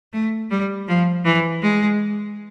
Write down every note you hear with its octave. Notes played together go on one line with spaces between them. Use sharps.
A3
G3
F3
E3
G#3